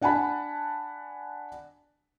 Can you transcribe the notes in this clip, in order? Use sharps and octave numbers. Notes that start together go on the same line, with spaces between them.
D4 F#5 G#5 A5 B5